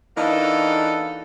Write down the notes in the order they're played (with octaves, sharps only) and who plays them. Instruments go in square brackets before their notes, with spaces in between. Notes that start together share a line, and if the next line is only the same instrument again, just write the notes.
[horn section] E3 A#3 D4 D#4 F#4 A4